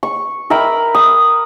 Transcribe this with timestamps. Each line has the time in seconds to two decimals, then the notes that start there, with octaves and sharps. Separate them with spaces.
0.03 C#6
0.50 A#4 E5 G5 B5
0.95 D#6